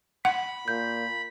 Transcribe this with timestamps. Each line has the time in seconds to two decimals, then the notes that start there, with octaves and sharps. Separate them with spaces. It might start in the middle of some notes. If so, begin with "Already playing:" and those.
0.25 F#5 B5
0.68 A#2 G6